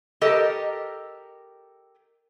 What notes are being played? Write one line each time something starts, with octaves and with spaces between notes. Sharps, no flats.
G4 A4 A#4 D#5